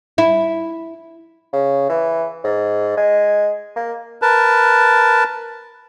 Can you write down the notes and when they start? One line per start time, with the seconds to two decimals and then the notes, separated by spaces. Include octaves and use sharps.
0.18 E4
1.53 C#3
1.89 E3
2.44 G#2
2.97 G#3
3.76 A#3
4.22 A#4 B4 A5